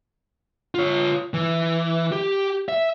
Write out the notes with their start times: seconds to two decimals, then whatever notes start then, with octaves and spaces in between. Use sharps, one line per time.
0.75 F4 C#5
1.34 E3
2.12 G4
2.69 E5